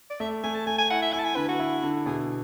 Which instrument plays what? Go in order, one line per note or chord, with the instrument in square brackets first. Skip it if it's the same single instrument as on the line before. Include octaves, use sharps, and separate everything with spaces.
[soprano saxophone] D5
[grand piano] A3 [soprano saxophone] E5
[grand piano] A3 [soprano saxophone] G#5
[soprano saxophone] A5
[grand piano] A3 [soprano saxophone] G#5
[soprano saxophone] G#5
[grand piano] E4 [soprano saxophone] F#5
[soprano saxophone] E5
[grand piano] E4 [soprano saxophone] G#5
[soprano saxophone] A5
G#5
[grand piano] D3 [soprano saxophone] B4
[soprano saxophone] F#4
[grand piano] E4
D3
[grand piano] B2 [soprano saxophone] G#4